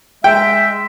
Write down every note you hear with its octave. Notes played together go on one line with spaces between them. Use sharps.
G#3 E5 G5